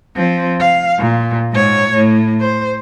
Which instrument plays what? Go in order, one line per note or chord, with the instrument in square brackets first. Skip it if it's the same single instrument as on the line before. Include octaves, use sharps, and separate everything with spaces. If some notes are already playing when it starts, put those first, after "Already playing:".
[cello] F3 C4
F5
A#2
G#2 C#5
A2
C5